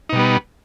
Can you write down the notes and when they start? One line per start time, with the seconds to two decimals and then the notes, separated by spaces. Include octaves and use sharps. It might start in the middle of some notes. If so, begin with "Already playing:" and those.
0.09 D#4
0.13 B2
0.16 G3
0.19 B3